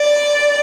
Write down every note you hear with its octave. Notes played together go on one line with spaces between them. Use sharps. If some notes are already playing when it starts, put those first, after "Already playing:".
Already playing: D5